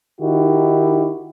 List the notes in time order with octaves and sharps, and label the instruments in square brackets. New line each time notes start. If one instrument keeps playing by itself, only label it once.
[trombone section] D#3 D#4 E4 F#4 G4